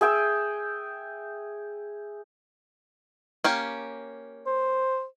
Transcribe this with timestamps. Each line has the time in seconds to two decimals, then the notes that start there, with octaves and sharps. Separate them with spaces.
0.01 G#4 E5 G5 E6
3.44 A#3 C#4 G4
4.47 C5